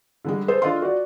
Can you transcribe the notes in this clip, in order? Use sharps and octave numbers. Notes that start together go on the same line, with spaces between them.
D3 G3 G#3
G#4 A4 C5
D4 F4 A4 D#5 F5 C6
F#4 D5